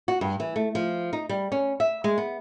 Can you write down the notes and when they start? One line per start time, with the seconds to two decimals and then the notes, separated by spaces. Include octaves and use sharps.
0.08 F#4
0.21 G2
0.40 E3
0.56 A3
0.75 F3
1.13 D#4
1.29 G3
1.52 C#4
1.80 E5
2.04 G#3
2.18 B3